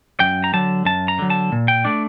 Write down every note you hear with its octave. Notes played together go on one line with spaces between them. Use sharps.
F#2 G5
A#5
D3 F#3 A5
F#2 A5
A#5
D3 F#3
A5
A#2
G5
A3 D4 D5